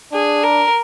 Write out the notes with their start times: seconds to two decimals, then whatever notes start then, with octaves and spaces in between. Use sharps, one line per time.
0.13 D4 G#4
0.43 A#4